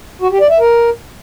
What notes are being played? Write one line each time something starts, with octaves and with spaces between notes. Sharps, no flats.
F#4
G4
D5
E5
A#4